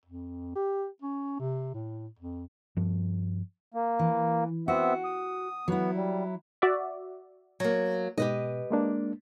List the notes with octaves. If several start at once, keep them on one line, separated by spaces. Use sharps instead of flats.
F2
G4
C#4
C3
A2
F2
G2 F3
A#3
E3
B3 C4 F#4 E5
D#6
F#3 B3 E4
G3
F#4 D5 E5
F#3 A#3
G#2 B2 G4 B4 D#5
G#3 A#3 D4